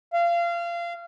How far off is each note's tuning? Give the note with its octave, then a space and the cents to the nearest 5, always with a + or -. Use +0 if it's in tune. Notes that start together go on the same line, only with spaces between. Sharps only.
F5 -25